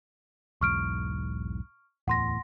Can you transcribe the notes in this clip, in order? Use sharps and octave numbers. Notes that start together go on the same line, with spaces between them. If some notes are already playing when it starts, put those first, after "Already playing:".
B1 E2 G#2 C#6 F6 D7
D1 E2 A2 F#5 C6 A#6